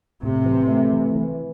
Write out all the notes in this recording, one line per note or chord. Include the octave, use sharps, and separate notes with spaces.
A2 C3
E3
A3
E3
E3